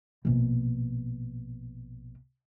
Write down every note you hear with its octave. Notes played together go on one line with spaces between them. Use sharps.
A#1 B2